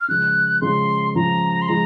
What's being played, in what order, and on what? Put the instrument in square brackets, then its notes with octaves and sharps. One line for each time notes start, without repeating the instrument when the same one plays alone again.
[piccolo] F6
[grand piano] C#3 F3 G#3 [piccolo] F#6
[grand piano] C#3 F3 G#3 [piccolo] C6
[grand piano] C#3 F3 G#3 [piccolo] A#5
[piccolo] C6
[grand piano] F3 G#3 [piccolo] A#5